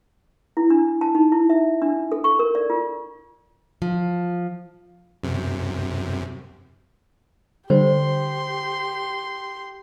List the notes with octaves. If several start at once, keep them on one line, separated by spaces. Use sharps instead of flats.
E4
D4
A5
D#4
E4
E5
D4
A4
C#6
A#4
D5
F4
F3
F#2 C3
D3 G3 G4 C5 C6